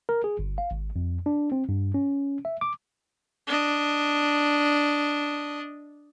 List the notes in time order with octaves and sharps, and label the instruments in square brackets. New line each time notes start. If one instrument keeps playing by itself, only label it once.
[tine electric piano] A#4
G#4
G1
F5
G#1
F2
D4
C4
G2
C#4
E5
D6
[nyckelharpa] D4 D#5